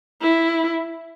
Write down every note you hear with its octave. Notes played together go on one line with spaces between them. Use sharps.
E4